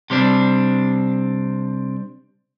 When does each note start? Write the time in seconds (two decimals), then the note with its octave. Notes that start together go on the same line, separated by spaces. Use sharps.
0.10 C3 G3 C4 D4